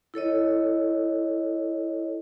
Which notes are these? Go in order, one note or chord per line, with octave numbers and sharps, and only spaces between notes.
E4 A4 C#5 D#5